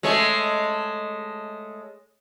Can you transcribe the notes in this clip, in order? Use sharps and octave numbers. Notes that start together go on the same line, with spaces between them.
G#3 A3 C#5